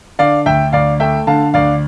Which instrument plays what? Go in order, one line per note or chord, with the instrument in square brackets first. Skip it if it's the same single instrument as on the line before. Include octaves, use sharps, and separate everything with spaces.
[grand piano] D3 D5 F5
D2 E5 G5
D2 D5 F5
A3 E5 G5
D3 F5 A5
D2 D5 F5